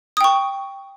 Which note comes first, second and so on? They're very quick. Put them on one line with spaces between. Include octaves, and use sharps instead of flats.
D#6 G5 C#6